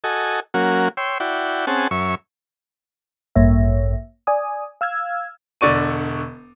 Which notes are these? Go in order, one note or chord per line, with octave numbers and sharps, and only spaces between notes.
F#4 A4 D#5 G#5
F#3 A#3 C#4 F#4
C#5 G5 C6 E6
E4 F#4 D5 G5
C4 C#4 G#4 F#5 A5
F#2 C#5 E5 C#6
A1 G2 A#3 C#5 E5
D5 G#5 D#6
F5 E6 F6 G#6
E1 D3 D5 C#6 D#7